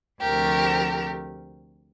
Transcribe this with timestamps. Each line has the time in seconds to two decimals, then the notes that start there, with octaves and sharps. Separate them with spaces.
0.22 D2 C3 F3 A3 G4 A#4